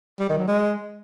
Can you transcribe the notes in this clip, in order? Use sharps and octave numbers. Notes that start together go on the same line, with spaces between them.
G3
D#3
F#3
G#3